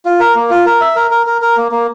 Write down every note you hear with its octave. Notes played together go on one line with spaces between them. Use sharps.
F4
A#4
A#3
F4
A#4
E5
A#4
A#4
A#4
A#4
A#3
A#3